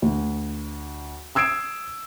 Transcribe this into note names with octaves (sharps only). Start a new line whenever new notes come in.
D2
D#6 E6 G#6 C7 D7 E7